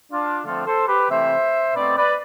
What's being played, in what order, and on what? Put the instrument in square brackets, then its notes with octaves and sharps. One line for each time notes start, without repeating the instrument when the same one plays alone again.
[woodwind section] D4 F4
D3 F3 A3 C4 F4 A4
A4 C5
G4 B4
C3 E3 A3 C4 C5 E5
B2 A3 C4 B4 D5
B4 D5